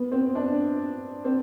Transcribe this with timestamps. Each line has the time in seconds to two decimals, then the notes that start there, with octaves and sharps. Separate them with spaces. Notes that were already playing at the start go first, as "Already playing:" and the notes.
Already playing: B3
0.12 C4
0.35 D4
1.25 C4